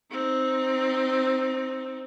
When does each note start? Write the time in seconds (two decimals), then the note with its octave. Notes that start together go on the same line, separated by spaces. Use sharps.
0.11 C4 D#4